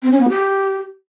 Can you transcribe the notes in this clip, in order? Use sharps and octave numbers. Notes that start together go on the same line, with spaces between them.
C4
C#4
B3
G4